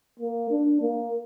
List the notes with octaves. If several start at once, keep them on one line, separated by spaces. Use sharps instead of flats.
A#3
D4
A#3